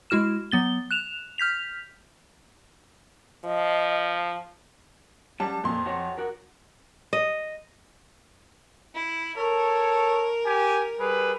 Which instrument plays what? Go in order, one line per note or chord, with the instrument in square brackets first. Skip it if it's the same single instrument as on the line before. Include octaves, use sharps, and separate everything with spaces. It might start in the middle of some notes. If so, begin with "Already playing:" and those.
[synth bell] G#3 E4 F#4 F6 E7
F#3 B3 A6 G7
F#6 E7 F7
F6 G6 B6 F7
[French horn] F3 [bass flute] D#5
[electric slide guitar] F#3 G3 C#4 [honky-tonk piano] A5
[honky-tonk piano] F2 C6 [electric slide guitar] A#2
[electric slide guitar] F#4 C#5
F#4 A#4
[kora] D#5
[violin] E4
[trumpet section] A4 C#5 [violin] A#4
[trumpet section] G4 G#5
G3 G#4 B4